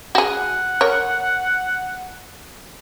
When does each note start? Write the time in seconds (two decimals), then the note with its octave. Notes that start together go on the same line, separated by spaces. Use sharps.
0.15 F#4 G#4 F#5
0.81 A#4 C#5